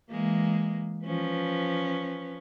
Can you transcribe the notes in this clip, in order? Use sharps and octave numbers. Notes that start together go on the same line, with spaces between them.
E3 G#3 A#3
F3 C#4 B4